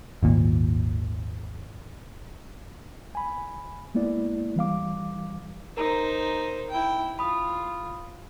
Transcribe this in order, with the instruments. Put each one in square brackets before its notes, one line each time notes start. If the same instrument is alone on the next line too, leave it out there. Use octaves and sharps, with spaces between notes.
[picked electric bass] G#1 D#2 A#2
[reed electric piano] G#5 B5
G#3 A#3 B3 E4 D5
E3 G3 F5 D6
[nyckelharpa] D#4 C5 [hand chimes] A#4 A#5
[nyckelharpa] E4 G5
[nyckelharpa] F4 [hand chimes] B5 D#6